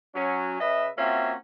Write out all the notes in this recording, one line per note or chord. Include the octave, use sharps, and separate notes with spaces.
F#3 C#4
C#3 B4 D#5 E5
A#3 C4 C#4 F4 F#4 E5